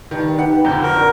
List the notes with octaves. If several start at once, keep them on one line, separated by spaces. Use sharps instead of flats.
G2 D#3
D#4 G4 B4 F#5
F2 D3 A#5 G6
F#4 A#4
A#2